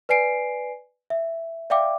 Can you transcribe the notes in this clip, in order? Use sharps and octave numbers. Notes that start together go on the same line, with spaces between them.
B4 D5 G#5 C7 D7
E5
D5 E5 F5 G5 D6